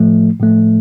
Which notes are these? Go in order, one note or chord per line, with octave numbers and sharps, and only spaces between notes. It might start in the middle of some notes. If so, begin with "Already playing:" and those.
Already playing: A2 F3 A3
A2 F3 A3